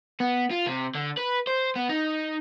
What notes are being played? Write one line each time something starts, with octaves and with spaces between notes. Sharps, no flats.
B3
F4
C3
D3
B4
C5
B3
D#4